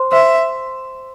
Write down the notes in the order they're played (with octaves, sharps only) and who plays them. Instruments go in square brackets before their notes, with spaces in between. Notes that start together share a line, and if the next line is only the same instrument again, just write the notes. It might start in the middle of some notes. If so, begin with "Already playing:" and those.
Already playing: [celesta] C5 C6
[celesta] C5 C6 [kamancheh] E5